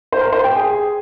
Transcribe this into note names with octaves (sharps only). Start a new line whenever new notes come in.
C5
A#4
C5
G4 G5
G#4 G#5